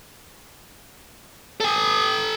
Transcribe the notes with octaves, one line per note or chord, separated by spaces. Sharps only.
A4 G#5